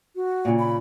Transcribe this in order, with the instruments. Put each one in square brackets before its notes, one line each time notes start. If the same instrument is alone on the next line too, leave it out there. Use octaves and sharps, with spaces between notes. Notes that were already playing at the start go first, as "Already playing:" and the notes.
[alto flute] F#4
[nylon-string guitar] A#2 C#3
[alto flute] B5